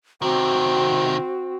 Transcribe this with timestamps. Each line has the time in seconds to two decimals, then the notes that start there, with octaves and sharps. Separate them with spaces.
0.22 C3 D#3 C4 F#4